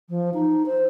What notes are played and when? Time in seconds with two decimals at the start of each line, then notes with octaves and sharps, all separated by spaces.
0.09 F3
0.34 D#4
0.66 C5